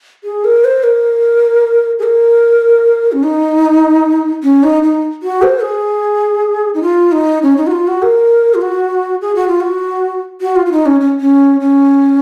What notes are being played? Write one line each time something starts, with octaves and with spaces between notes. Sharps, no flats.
G#4
A#4
C5
A#4
G#4
A#4
C#4
D#4
C#4
D#4
D#4
F#4
C5
G#4
D#4
F4
D#4
C#4
D#4
F#4
F4
F#4
A#4
F4
F#4
G#4
F#4
F4
F#4
F#4
F4
F4
D#4
C#4
C#4
C#4
C#4